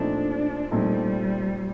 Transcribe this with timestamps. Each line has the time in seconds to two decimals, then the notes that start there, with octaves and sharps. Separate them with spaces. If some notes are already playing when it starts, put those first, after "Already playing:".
Already playing: A#2 F3 A3 C4 D4 D#4
0.71 A#2 F3 G3 A3 C4 D#4